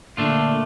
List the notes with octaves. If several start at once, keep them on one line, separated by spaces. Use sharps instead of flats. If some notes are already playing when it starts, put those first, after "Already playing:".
A#2 D3 A3 D4 F4 A4